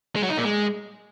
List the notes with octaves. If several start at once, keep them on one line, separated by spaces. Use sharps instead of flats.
G#3
F#3
D#4
A#2
G#3